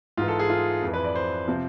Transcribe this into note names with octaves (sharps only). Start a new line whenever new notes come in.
G#2 E3 F4
A4
G#4
F4
F2 E3
B4
D5
C5
C3 F3